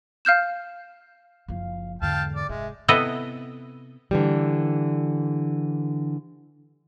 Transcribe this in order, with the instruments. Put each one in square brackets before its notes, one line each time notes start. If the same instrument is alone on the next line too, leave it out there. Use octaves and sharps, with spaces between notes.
[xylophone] F5 F6 G6 E7
[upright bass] F#1 F3 [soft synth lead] F5
[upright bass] E2 G#2 [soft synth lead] D3 [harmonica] F5 G5 A5
[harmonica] D5
[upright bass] F1 G#2 [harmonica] G#3 [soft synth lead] E5
[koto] C3 B3 E4 A4 D#5 F#5
[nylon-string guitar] D3 E3 G3